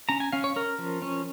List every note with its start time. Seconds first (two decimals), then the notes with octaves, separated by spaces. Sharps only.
0.09 C#4 A#5
0.20 G#5
0.32 C#4 F5
0.44 C#5
0.56 C#4 A#4
0.79 F3
1.02 C#4